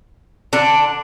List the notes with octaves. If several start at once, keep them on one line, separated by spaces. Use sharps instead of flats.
D3 D4